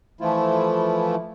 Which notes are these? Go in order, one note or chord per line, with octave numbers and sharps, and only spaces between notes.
E3 F3 A3 E4 F4